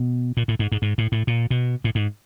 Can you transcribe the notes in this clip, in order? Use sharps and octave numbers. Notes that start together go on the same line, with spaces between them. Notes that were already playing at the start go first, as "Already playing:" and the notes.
Already playing: B2
A#2
A2
G#2
G#2
G#2
A2
A2
A#2
B2
A2
G#2